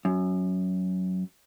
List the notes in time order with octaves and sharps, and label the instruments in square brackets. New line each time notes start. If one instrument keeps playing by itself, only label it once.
[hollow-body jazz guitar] F#2